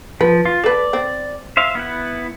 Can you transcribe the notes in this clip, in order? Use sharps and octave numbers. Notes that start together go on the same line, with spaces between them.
F3 B4
F4
A4 B4 D5
C4
C5 E5 F5
B3 E4 F#5